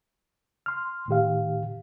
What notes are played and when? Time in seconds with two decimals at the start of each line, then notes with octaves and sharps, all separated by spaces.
0.66 C6 F6
1.08 A2 D#3 G4 F5